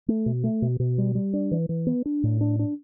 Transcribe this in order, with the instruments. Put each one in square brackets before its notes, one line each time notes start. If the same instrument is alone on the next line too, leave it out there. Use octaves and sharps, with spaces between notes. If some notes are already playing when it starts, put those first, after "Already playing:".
[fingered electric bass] A3
B2
A3
B2
B2
G3
G3
D4
E3
E3
B3
D4
A2
D4
D4